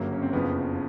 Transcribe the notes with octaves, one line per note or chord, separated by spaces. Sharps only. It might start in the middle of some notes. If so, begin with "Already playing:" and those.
Already playing: G1 F#2 C#3 F#3 A#3
C#4
C4
F#1 F2 C#3 F3 B3